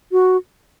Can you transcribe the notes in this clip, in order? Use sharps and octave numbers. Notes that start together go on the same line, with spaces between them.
F#4